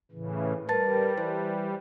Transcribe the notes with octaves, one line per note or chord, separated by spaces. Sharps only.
A2 C#3 E3
G3 A#4 B4 A5 A6
E3 C5